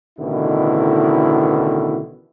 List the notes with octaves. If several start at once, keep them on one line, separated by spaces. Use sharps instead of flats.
A1 B2 D3 D#3 E4